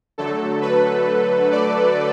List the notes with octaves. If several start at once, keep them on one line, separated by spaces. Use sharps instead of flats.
D3 F#3 A3 A4
B4
D5